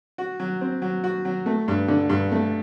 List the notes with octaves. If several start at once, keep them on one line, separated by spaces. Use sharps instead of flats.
F#4
F#3
C4
F#3
F#4
F#3
A3
G2
D3
G2
A3